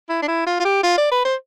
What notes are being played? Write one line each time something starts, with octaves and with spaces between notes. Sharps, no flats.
E4
D4
E4
F4
F4
G4
F4
D5
B4
C5